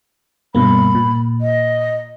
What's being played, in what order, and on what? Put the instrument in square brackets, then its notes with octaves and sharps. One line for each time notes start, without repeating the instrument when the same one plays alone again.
[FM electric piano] G2 B2 A#3 [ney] B5
[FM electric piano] A#2
[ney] D#5